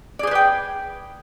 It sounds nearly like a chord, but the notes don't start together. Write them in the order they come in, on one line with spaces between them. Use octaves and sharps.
D5 G#4 C5 B4 G5